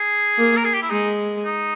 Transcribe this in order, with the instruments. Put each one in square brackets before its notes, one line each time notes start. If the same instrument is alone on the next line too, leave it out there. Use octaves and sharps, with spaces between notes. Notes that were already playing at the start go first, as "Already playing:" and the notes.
Already playing: [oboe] G#4
[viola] A#3
[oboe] A#4
G#4
G4
E4
[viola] G#3 [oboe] D#4
[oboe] D#4